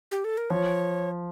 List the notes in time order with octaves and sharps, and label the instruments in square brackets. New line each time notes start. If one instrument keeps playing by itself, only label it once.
[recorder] G4
A4
A#4
[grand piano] F3 [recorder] C#5